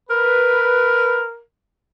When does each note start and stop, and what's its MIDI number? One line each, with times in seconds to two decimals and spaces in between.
0.10 1.41 70
0.10 1.24 71